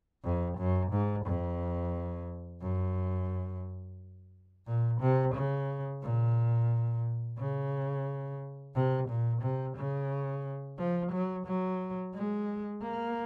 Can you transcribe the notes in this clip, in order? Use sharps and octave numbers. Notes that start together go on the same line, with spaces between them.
F2
F#2
G#2
F2
F#2
A#2
C3
C#3
A#2
C#3
C3
A#2
C3
C#3
F3
F#3
F#3
G#3
A#3